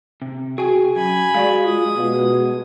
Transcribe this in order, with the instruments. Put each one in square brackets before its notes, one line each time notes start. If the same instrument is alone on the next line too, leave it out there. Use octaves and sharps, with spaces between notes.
[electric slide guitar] C3
[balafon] F#4 G5 [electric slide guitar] G#4 G#5
[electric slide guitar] F#2 [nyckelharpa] G#5 B5
[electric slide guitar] G#3 [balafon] F#4 D5 F5
[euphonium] F4 [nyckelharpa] D#6
[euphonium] B2